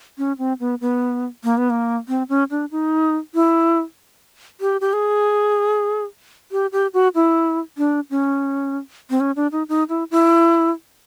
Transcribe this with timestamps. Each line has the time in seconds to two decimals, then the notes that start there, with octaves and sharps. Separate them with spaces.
0.18 C#4
0.38 C4
0.60 B3
0.81 B3
1.44 A#3
1.58 B3
1.70 A#3
2.08 C4
2.29 C#4
2.51 D4
2.71 D#4
3.34 E4
4.61 G4
4.81 G4
4.93 G#4
6.52 G4
6.72 G4
6.94 F#4
7.15 E4
7.78 D4
8.10 C#4
9.10 C4
9.20 C#4
9.36 D4
9.52 D#4
9.69 D#4
9.89 E4
10.11 E4